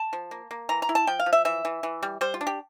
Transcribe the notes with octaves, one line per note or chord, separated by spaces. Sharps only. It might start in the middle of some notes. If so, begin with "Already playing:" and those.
Already playing: A5
F3
A#3
A#3
E3 A#5
A#5
E4
A5
F3 G5
F5
F3
E5
E3 E5
E3
E3
G3
G3 C5
F4
D4
G4